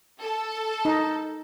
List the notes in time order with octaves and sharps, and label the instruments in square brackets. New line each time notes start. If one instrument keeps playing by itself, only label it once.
[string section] A4
[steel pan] D#4